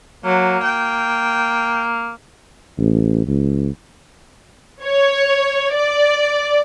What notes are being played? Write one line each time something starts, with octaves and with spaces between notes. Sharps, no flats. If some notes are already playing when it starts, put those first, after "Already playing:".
F#3 A#3
G5
A1
C#2
C#5
D5